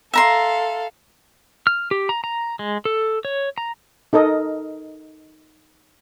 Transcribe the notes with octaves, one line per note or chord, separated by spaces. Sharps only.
A4 E5 F5 A#5 C6
F6
G4
A#5
A#5
G#3
A4
C#5
A#5
D#4 A4 A#4 D#5